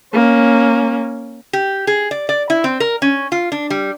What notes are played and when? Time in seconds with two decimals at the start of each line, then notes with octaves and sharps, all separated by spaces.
0.14 A#3 C#4
1.53 G4
1.87 G#4
2.11 D5
2.29 D5
2.50 E4
2.64 C4
2.80 A#4
3.02 C#4
3.32 F4
3.52 D4
3.70 G3